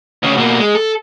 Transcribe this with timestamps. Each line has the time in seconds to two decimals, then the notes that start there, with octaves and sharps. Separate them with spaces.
0.23 D2 C#3
0.37 B2 A#3
0.59 G#3
0.75 A4